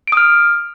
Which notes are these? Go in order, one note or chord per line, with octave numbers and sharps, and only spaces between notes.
D#6 F6 D7